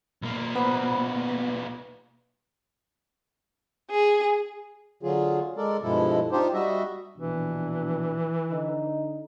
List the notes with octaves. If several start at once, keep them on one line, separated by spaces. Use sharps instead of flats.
B1 A#3
B3 B4 C5 B5
B4
G#4
D3 F#3 F4 G#4
G#3 A4 A#4 D5
G2 B2 F3 G#3 E4 A4
D4 D#4 F4 G4 C5
G3 F#4 D#5 E5
A#1 B2 E3 D4
D3 D#4